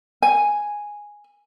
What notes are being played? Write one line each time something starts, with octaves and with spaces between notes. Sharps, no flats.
G#5